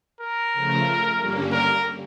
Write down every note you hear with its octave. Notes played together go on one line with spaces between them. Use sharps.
A#4
C#3 F3 A3
G2 D3 G3 A#3 C#4
A#4